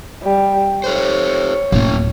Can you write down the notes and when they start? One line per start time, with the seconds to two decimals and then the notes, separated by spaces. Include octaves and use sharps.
0.23 G3
0.84 G4 A4 C5 C#5
1.72 D1 A#3 C#4